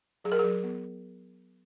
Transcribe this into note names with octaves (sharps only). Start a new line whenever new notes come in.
F#3 G#4
A#4
F#3 G#4
B3